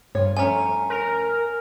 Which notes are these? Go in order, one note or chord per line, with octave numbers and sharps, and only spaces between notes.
G2 F4 C#5
F3 A3 C#4 G#5 A#5
A#4